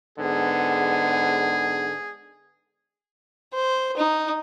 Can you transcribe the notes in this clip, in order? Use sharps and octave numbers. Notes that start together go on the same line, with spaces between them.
G#2 D3 B3 G#4
C5
D#4